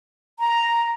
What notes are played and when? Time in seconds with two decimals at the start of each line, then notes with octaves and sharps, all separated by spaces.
0.39 A#5